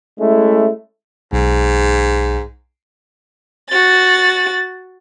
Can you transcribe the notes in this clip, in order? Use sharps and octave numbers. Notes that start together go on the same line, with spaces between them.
G#3 A3 C#4 E4
B1 G#2
F#4 A6